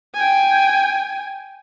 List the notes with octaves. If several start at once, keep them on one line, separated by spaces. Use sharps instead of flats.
G5 G#5